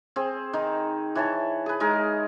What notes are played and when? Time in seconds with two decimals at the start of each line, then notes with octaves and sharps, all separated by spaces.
0.16 C4 G#4
0.53 D#3 D#4
1.15 E3 C#5 A5
1.66 G#4 B4
1.80 G#3 D#4 G#4 A#4